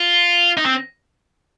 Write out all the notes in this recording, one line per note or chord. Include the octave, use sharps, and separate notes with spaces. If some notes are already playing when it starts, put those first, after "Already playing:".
Already playing: F4
D#4
C4